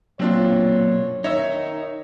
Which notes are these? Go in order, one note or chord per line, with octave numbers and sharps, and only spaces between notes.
B1 F#2 A#2 C4 D4 F4 C#5
D#3 D#4 C#5 E5 E6